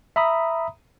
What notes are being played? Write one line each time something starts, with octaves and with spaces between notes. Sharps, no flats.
E5 A#5 B5 D#6